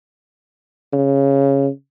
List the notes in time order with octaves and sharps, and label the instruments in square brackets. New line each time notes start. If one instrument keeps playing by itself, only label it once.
[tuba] C#3